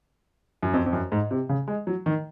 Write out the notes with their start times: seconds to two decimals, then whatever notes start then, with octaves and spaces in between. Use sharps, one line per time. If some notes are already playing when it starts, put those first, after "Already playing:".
0.63 F#2
0.74 F2
0.86 F2
0.93 F#2
1.12 G#2
1.31 C3
1.49 C#3
1.68 G#3
1.87 F#3
2.06 D#3